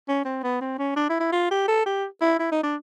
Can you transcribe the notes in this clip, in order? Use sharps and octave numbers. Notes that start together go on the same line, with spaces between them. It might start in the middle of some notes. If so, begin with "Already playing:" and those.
C#4
C4
B3
C4
C#4
D4
E4
E4
F4
G4
A4
G4
E4
E4
D#4
D4